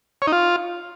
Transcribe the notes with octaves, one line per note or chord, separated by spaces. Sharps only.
C#5
D#4
F4